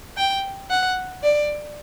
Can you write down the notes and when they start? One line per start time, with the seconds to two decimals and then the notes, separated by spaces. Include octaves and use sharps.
0.17 G5
0.71 F#5
1.23 D5